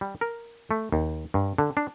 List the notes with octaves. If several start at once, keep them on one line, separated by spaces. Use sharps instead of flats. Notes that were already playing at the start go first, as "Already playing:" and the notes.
G3
A#4
A3
D#2
G2
D3
D4